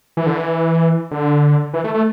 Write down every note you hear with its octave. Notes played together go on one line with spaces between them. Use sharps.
E3
D3
E3
D3
E3
A3
A3